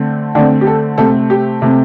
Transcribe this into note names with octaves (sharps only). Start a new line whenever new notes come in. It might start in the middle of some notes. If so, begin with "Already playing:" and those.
Already playing: D3 A3 C4
D3 A3 C4 D4
G4
A4
C3 A3 C4 A4
G4
C3 A3 C4